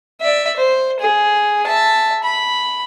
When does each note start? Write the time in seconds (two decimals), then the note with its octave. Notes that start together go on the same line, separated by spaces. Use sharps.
0.22 D5 E5
0.57 C5
1.00 G#4
1.67 E5 A5
2.24 B5